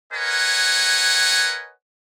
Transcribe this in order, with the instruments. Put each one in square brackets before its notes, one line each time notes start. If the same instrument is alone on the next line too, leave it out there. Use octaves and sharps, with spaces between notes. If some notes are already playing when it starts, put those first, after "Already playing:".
[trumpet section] A#4 B4 C#5 D#5 F#5 G#5